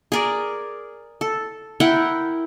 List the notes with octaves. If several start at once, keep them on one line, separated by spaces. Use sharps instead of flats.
G#4 A#4 D5
A4
E4 A#4 F#5 G5